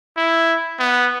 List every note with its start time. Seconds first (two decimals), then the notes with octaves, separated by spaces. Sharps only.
0.17 E4
0.80 B3